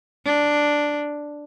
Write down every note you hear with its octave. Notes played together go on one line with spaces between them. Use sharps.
D4